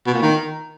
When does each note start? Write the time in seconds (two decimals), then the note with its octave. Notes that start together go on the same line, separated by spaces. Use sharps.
0.07 B2
0.14 A#2
0.22 D#3